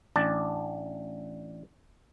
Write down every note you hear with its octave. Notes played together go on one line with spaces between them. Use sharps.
A1 D4 A5